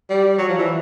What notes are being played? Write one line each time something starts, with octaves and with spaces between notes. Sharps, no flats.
G3
F#3
F3
E3